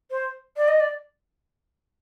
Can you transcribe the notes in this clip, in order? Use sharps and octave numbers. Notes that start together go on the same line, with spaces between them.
C5
D5
D#5
D5